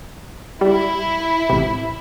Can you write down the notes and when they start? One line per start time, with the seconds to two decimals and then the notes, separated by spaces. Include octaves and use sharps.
0.61 G3 E4
1.50 A1 C3